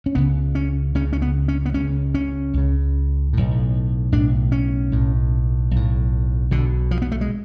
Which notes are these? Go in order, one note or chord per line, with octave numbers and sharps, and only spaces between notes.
C#4
C#2 C#3 B3
C#4
C#2 C#3 C#4
C#4
B3
C#4
B3
C#2 C#3 C#4
C#4
C#2 C#3
B1 A2
B1 A2 D4
C#4
B1 A2
B1 A2
B1 B2 D3
F3
B3
A3
G#3